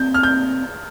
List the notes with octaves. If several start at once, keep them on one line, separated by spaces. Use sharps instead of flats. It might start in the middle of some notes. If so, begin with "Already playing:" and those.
Already playing: C4 G6
F6
G6